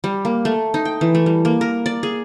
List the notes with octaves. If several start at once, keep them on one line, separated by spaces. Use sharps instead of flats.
G3
A#3
A3
D#4
G5
E3
A3
G3
A#3
A#4
D5
G#4